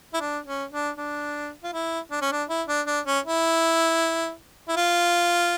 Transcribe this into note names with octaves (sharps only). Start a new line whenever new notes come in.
E4
D4
C#4
D4
D4
F4
E4
D4
C#4
D4
E4
D4
D4
C#4
E4
E4
F4